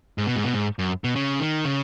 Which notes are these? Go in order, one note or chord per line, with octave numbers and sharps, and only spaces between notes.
G#2
B2
G#2
B2
G#2
F#2
B2
C#3
D#3
C#3